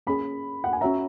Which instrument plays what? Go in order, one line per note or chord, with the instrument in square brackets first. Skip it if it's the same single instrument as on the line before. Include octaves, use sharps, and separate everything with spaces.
[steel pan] A#3 C#4 G#4 [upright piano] B5
[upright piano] F#5
G#5
[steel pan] C#4 F#4 C#5 E5 [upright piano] A#5